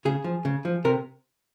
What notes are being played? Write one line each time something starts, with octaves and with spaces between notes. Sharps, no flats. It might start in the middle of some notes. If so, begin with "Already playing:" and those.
C#3 G#4
F3
C#3
F3
C3 A#4